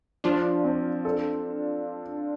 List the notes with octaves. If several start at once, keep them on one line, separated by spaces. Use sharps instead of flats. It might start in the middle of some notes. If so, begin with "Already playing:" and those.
F3 D4 F4
C4
A4